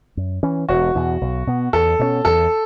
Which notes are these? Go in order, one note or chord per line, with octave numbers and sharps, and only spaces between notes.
F#2
E3 C#4
E1 F#4
E2 B2
B1
B2 B3
E2 A4
B2 A3 C#4
E2 A4